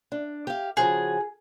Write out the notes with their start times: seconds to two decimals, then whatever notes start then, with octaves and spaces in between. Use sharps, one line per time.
0.12 D4
0.47 G4 F5
0.77 C#3 F3 F#4 G#4